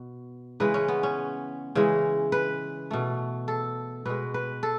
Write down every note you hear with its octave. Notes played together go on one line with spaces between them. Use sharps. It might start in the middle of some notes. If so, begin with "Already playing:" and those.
Already playing: B2
C#3 E3 G#3 B4
C#4
B3
C#4
C#3 E3 G#3
B4
B2 A3
A4
B2 G#3 B4
B4
A4